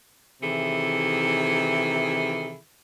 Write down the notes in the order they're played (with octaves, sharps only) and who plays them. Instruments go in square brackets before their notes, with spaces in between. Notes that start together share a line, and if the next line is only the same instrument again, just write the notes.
[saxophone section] C3 D#3 E3 E4 G#4 A4